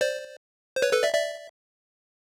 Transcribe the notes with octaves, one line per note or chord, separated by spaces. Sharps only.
C5 D5
C5
B4 C#5
A4 B4
D5 E5
D5 E5